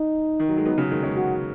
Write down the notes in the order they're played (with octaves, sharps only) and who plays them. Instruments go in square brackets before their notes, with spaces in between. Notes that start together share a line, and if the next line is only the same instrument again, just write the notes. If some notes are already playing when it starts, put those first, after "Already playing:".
Already playing: [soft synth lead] D#4
[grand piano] D#3
F#3
G#3
F#3 B3
C#3 F#3
D#3 G#3
G#3 C#4
[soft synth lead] F#4